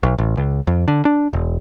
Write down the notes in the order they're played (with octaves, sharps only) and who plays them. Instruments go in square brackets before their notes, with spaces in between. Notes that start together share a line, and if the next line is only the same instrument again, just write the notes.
[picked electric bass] B1
A1
C#2
F2
D3
D4
E1